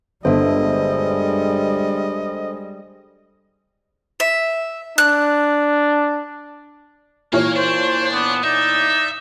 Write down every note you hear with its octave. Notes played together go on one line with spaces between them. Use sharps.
G1 G3 G#3 D4 A4 C5 D#5
E5
D4 F#6
A#2 E3 A#3 C#5 F6
D4 C5 C#6
B3 C6 D6
D#4 D5 E5 D6